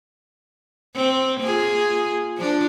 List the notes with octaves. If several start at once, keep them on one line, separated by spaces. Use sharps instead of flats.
C4
A#3 F4 G#4
F3 D4